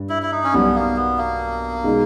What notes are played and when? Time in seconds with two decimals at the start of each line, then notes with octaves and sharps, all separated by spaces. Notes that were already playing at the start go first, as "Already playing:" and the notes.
Already playing: G2 G3
0.09 E4
0.23 E4
0.32 D#4
0.43 C#4
0.53 B1 B2 G3 B3
0.75 A#3
0.96 B3
1.18 A#3
1.84 B2 G#3 D#4